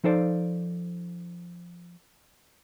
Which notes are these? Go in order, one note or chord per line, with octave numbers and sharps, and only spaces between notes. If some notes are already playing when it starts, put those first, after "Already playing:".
F3 D#4 A4 C5 D5 F5